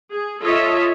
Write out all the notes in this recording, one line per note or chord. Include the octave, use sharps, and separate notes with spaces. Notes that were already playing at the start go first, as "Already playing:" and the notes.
G#4
F4 A4 C#5 D#5 E5